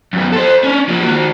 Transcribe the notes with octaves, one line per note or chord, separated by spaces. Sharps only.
F#2 B3
A4 C5
C#4 D4
F3 A#3
D#3 F#4